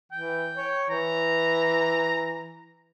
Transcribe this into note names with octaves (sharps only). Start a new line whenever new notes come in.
E3 G5
C#5
E3 A#5